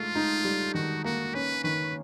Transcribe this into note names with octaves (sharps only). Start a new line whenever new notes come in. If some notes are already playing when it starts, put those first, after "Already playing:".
Already playing: G#2 A3 F4
D#4
G3
D#3 F#4
A#3 F#4
C#4 B4
D#3 B4